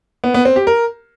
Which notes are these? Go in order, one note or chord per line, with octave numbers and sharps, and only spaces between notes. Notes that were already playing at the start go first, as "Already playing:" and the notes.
B3
B3
C4
G4
A#4